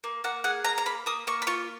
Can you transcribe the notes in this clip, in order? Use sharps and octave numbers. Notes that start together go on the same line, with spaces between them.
A#3
A#3 F#5
G#4 F#5
A#3 A#5
A#5
A#3 B5
A#3 D#6
A#3 C#6
B5
F4 C#6